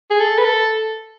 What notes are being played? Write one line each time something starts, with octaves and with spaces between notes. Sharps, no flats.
G#4
A4
B4
A4